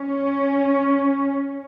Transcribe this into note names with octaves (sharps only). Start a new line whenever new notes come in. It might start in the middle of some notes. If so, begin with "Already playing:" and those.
Already playing: C#4